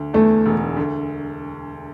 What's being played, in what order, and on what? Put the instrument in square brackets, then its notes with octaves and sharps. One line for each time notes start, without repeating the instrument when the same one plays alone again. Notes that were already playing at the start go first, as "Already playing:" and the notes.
Already playing: [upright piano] D2
[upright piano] E2 [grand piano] A3
[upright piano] E1
D2